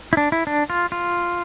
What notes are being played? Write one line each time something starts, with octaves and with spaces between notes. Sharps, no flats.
E4
D4
E4
D4
F4
F4